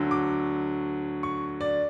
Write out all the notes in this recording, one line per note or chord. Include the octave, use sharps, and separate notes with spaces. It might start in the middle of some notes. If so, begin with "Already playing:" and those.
Already playing: D2 D3 F#3
D6
C#6
D5